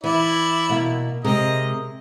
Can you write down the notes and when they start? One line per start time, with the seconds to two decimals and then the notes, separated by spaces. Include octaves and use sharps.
0.04 E3 E4 D5
0.69 B2 A#3
1.24 C3 G#3 A#4 D#5